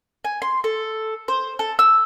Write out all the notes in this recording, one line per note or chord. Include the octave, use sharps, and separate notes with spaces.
G#5
C6
A4
C5
A4
E6